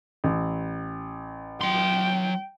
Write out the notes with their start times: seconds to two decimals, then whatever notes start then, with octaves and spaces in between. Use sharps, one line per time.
0.24 A1
1.61 F#3 G5 C6